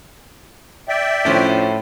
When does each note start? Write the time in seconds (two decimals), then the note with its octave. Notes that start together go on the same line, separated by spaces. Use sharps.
0.88 D5 E5 G5
1.25 A2 F3 C#4 D4